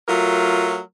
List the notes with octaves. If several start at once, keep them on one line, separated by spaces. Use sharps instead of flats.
F#3 A3 F4 A#4